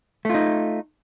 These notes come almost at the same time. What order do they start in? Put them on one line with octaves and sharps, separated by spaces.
A3 F4 D#4